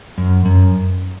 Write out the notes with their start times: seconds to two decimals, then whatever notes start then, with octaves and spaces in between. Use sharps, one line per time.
0.18 F#2
0.45 F#2